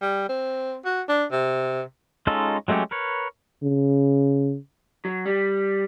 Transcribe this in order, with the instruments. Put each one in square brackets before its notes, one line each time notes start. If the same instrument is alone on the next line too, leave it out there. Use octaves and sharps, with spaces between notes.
[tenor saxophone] G3
C4
F#4
D4
C3
[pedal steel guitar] G#3 C#4 D#4 F4 A4
F#3 G#3 A3 C#4 G4
A#4 B4 C#5
[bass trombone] C#3
[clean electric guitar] F#3
G3